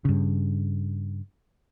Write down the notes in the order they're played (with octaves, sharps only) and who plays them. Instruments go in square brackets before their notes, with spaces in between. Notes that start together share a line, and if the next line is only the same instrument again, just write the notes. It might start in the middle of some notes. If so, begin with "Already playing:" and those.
[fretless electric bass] G2 C#3